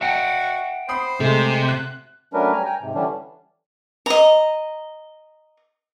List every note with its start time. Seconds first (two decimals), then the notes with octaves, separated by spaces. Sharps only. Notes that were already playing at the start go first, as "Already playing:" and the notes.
0.01 F#4 E5 F#5 G5
0.89 C5 B5 D#6 C7
1.20 C3 G#3 A3
1.69 F#6
2.34 F#3 A3 C#4 D4 A#4 B4
2.52 G3 G#5 A#5
2.65 G5 G#5 A#5
2.81 G#2 C3
2.95 D3 E3 G3 C#4 D4
4.06 D#5 A#5